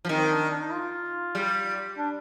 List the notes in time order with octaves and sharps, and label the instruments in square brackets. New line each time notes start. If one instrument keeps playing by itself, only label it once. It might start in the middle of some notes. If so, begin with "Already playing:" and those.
[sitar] F3
[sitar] D#3 [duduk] C4
[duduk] D4
D4
D#4
F4
[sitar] G3
[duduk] D4